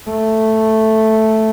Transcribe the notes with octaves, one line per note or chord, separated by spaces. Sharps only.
A3